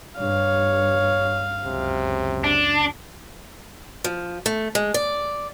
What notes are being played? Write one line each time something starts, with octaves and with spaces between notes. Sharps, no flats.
G2 C#5 F5
C#2 F#2 C3
D4
F3
A3
G#3
D5